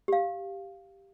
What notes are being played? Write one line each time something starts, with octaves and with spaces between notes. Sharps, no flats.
G4 F5